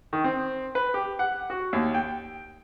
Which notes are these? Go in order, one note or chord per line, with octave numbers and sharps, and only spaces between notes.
D#3
C4
B4
G4
F#5
F#4
D#2
G5